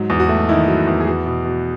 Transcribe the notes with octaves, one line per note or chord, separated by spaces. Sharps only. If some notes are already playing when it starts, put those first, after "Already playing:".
Already playing: G#2 F#3
E2
F#4
A3
D#3 E4
F#3
E2
G#4
B3 F#4
B2
B2